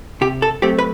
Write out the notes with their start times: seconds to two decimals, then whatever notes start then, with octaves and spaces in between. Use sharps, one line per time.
0.21 C3 G4
0.42 A4
0.62 F#3 A3 C4 G4
0.79 B4